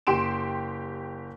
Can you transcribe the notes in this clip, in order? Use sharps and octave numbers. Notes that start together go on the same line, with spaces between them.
F#1 G4 C6 D7 E7